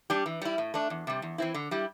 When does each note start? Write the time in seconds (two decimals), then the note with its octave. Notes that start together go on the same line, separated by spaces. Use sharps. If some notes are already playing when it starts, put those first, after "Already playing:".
0.10 G3 D4 G4
0.26 E3
0.42 G3 E4
0.58 A2
0.74 A3 D4
0.90 E2
1.07 C3 G3
1.22 E2
1.38 E3 C4 E4
1.55 D3
1.71 G3 E4 G4